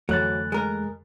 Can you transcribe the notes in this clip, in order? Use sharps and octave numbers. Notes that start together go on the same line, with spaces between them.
F2 D3 E3 F#3 A3 F#6 A6
G#3 A#4